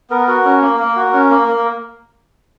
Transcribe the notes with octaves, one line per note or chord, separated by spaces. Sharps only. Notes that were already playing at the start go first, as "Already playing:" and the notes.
B3 A#4
F#4 A#4
C#4
A#3
A#3
F#4
C#4
A#3
A#3